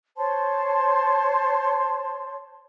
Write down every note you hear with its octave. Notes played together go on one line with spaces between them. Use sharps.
C5 C#5 A5 C6